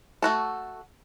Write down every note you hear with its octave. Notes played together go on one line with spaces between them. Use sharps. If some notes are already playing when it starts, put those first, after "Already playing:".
A3 F#4 A4